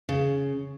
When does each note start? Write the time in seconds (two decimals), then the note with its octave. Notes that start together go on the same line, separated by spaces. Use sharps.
0.09 C#3